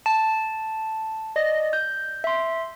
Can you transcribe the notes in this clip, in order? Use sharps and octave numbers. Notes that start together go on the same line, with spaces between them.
A5
D5 D#5 A#6
G6
E5 C6